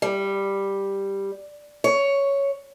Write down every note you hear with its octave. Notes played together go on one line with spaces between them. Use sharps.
G3
C#5